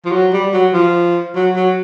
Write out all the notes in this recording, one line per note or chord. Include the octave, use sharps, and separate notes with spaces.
F3
F#3
G3
F#3
F3
F#3
F#3